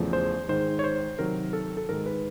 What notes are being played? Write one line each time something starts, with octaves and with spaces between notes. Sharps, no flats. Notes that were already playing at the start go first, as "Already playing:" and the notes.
Already playing: E2 C#3 F3 A3
C5
G#2 D#3 G#3 C5
C#5
C5
C3 D#3 F#3 A#4
A4
A4
G#2 D#3 G#3 A#4
B4